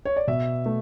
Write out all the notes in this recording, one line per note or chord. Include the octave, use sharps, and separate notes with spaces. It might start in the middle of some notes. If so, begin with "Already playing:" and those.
C#5
D5
B2 E5
A3